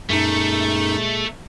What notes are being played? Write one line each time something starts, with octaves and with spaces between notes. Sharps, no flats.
F#2 A#2 G#3 A3 D#4